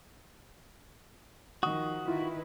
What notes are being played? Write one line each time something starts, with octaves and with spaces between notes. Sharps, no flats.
D#3 F3 F#4 D#6
D#3 E4 F4 B4